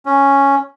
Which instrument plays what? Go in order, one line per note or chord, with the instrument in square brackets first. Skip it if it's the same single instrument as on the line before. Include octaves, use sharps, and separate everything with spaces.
[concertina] C#4